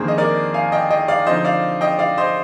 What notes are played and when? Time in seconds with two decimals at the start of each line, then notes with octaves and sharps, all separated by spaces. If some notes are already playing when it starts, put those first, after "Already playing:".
Already playing: F2 D#3 A#3 D4 G#4 C5
0.08 D#5
0.18 A#4 D5
0.54 F5 G#5
0.72 D#5 G5
0.91 D#5 G5
1.08 D5 F5
1.27 D3 F3 C4 D#4 C5 D#5
1.45 D5 F5
1.81 D#5 G5
1.99 D5 F5
2.18 C5 D#5